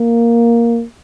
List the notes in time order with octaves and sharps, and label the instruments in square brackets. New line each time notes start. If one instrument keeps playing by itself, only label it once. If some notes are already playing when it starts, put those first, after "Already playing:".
Already playing: [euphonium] A#3